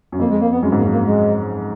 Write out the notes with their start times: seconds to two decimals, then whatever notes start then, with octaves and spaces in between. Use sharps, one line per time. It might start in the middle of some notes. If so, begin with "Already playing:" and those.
0.12 F#2
0.19 F2 A#3
0.31 G#3
0.41 A#3
0.53 B3
0.63 F#2 G#3
0.72 G#2
0.78 A#3
0.82 F#2
0.92 A#3
1.07 G#3